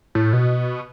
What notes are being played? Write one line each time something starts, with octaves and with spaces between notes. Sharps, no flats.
A2
B2